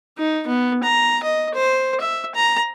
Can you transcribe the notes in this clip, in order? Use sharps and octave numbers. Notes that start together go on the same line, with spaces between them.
D#4
B3
A#5
D#5
C5
E5
A#5